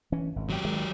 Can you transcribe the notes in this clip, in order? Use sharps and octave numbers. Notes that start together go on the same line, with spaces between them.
E3 C#4
G#1
F#3 G4
D#3 G#3